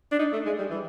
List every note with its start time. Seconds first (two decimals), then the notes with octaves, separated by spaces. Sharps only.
0.12 D4
0.19 D#4
0.33 A3
0.46 G#3
0.59 G3
0.71 E3